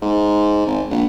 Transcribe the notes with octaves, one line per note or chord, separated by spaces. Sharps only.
G#2
G#1
A#1